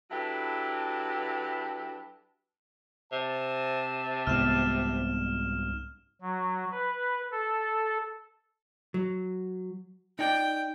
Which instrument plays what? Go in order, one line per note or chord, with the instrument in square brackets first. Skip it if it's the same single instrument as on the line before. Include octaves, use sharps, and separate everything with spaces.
[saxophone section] F#3 D4 E4 G4 A4 B4
[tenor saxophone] C3 [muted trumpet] A5
[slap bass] C2 G#2 B3 [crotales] F6 E7
[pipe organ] F#3
B4
A4
[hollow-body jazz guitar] F#3
[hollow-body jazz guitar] D#4 D5 [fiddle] G5